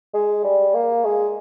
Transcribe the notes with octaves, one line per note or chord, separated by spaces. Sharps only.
G#3
G3
A#3
G#3